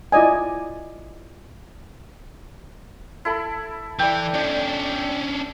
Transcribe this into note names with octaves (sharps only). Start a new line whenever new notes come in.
E4 F4 D5 D#5 G#5
E4 A4 B5
E3 D5 G5
C#4 D4 D5